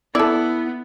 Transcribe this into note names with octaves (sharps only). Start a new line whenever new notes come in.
B3 E4 A4 D5